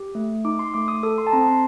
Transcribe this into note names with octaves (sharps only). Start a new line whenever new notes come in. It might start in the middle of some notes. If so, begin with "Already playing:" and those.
Already playing: G4
A3
D#4 D6
C6
A3 D6
D#6
A4 D#6
C6
A5
C4 A#5
C6